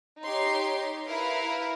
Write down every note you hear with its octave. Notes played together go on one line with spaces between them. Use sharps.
D#4 G4 C#5 C6
E4 A#4 B4 F5